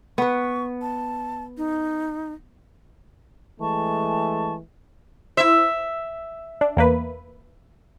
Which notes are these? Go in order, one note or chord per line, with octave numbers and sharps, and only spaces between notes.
B3 B4 C#6
A5
D#4
E3 G#3 A3 A5 C#6
E4 C5 E5
D4
E2 A#3 B4